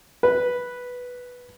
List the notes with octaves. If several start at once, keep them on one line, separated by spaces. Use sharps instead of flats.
B4